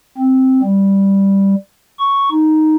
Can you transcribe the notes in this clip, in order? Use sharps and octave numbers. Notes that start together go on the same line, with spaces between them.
C4
G3
C#6
D#4